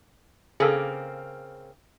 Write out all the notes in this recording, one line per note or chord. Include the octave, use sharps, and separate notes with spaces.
C#3 A#3 C4 G#4 A4